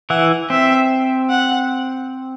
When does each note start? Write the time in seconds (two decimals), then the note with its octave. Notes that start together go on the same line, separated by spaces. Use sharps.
0.10 E3 E4 F#5
0.50 C4 E5
1.30 F#5